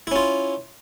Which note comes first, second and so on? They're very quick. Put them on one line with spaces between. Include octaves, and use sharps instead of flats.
E4 C#4 F4